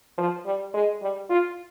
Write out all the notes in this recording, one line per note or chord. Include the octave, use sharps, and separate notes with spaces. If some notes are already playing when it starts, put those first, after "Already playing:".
F3
G3
G#3
G3
F4